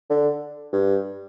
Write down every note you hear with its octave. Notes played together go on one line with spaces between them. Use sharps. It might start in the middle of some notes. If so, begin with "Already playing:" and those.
D3
G2